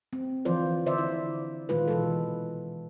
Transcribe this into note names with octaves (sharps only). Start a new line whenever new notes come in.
C4
D3 E3 F3 F4 C5 D5
D3 C5 D5 E5
E4
A#2 D#3 G#3 F4 B4
B2 E3 G#3 A4